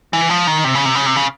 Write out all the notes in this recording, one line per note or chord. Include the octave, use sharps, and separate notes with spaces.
E3
F3
D#3
C3
C#3
C3
C#3
C3
C#3